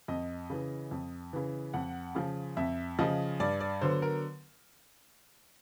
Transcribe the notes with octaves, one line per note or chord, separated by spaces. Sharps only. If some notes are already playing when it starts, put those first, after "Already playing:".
F2 D#5
C#3 E3
F2
C#3 E3
F2 F#5
C#3 F3
F2 E5
C#3 F3 D#5
G2 D5
D5
D3 F#3 B3 C5
A#4